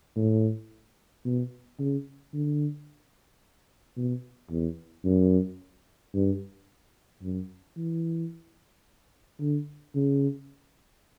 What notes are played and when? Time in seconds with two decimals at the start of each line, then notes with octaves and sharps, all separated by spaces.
0.16 A2
1.25 B2
1.79 C#3
2.34 D3
3.97 B2
4.51 E2
5.05 F#2
6.14 G2
7.23 F#2
7.77 E3
9.40 D3
9.95 C#3